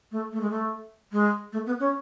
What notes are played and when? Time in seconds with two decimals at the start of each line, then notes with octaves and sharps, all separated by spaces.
0.12 A3
0.32 A3
0.41 G#3
0.50 A3
1.12 G#3
1.53 A3
1.66 B3
1.80 C#4